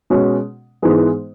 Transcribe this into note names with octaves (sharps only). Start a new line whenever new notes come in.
B2 G#3 C#4
G#2 E3 G#3 B3 G#4